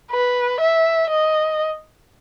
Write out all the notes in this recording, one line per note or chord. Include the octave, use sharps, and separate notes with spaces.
B4
E5
D#5